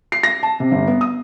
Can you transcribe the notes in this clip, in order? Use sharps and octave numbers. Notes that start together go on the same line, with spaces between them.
C7
A#6
A5
C3
G1
B3
D#6